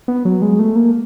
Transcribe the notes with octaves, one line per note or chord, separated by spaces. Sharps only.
B3
F#3
G#3
A3
A#3